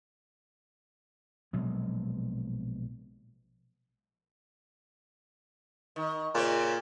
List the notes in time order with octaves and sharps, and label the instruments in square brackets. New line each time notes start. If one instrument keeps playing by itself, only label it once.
[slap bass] A#1 B2 F#3 G#3
[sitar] D#3
[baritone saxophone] A#2 [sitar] C#3 C4